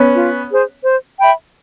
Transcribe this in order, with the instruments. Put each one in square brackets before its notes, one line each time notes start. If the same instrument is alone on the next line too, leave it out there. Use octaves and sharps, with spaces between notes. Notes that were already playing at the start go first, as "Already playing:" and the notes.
Already playing: [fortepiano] B3 C#4
[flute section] F4
G#4 C5
C5
E5 G5 B5